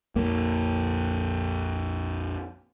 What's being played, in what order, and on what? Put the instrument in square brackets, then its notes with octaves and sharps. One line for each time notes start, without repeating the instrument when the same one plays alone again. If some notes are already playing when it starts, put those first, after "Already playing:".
[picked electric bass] A#1 F2 A#3